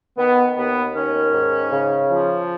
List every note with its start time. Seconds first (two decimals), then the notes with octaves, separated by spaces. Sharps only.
0.17 D#3 B3
0.56 D#2 B3
0.94 D#3 C#4
1.33 G#2
1.71 C#3
2.10 F3